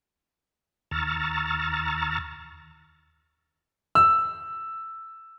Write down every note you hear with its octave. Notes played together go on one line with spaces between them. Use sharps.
D#2 A#5 C#6 E6 F6 A6
E6